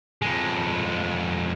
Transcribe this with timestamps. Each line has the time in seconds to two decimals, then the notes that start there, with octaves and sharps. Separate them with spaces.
0.22 F2 G#3